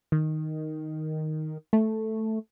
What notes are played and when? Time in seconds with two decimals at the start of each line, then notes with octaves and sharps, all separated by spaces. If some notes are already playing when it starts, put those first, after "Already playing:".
0.12 D#3
1.73 A3